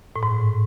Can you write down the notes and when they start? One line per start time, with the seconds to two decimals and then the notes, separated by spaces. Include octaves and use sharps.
0.16 A2
0.23 G#2